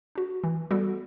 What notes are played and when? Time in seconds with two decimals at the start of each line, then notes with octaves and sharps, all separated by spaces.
0.15 D4 F#4
0.44 E3
0.71 G3 B3 F#4 A4